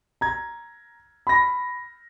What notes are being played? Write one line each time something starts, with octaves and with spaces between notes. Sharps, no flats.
A#5 G#6
B5 A#6